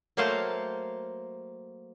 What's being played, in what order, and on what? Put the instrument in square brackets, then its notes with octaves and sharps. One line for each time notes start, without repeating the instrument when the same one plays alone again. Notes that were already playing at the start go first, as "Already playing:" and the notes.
[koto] F#3 A3 A#3 C5 F5 A5